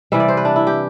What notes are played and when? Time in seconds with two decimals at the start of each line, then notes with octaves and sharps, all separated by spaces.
0.12 C3 E3 G3 E5
0.20 D5
0.28 C5
0.37 B4
0.45 D4
0.56 E4
0.67 G4